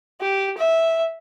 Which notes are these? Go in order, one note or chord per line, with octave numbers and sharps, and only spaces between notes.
G4
E5